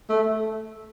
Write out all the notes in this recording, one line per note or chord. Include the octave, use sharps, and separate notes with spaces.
A3